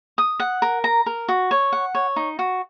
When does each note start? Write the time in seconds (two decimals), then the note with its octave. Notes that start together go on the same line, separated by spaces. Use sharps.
0.18 D#6
0.40 F#5
0.62 A#4
0.84 A#5
1.06 A#4
1.28 F#4
1.51 C#5
1.72 F#5
1.95 C#5
2.16 D#4
2.39 F#4